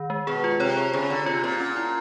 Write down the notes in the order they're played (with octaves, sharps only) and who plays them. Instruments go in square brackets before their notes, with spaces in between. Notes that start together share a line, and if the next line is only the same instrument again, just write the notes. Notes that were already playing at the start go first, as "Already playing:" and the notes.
Already playing: [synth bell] D#3
G#3
[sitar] B2 [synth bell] G#4
[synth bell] F4
[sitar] C3 [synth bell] C#5
[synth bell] G#4
[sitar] C#3 [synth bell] G#4
[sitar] D3 [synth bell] C#5
[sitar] C3 [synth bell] F4
[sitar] A#2 [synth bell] F4
[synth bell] C#4
E4